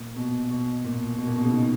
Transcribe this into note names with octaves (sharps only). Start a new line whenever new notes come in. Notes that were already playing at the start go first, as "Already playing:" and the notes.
Already playing: A#2
B2
B2
A#2
B2
A#2
B2
C#3
D#3